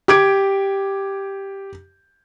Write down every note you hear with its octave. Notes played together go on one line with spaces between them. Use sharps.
G4 D6 G#6 D7